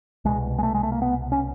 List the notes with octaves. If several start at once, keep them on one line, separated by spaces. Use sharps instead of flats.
C2 B2 G#3
G#3
A3
G#3
A3
A#3
B3
C#4